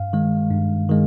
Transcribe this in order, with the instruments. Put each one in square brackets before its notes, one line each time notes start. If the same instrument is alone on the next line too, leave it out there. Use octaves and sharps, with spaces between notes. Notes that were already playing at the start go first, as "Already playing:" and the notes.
Already playing: [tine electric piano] G2 F5
D#3 G#3
G2
D#3 G#3